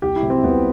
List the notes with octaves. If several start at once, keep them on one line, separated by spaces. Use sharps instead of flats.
C2 G4
E4
C3 F#3
C4
C2 B3